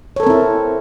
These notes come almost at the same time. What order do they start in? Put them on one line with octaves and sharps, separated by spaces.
C#5 A4 A#4 C4 E4